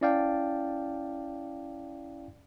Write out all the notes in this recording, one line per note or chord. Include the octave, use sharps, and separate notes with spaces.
C#4 E4 D5 F5 G5 A5